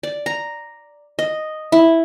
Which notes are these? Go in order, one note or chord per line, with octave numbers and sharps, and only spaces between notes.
D5
A#5
D#5
E4